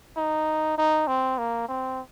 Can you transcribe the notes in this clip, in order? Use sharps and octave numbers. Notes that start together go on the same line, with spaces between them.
D#4
D#4
C4
A#3
C4